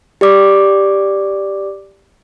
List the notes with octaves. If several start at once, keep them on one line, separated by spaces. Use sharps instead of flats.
G4 D5 D6